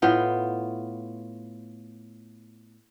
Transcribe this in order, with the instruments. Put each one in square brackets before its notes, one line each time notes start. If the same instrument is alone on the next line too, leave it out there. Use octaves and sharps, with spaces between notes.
[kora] A2 B3 F4 G5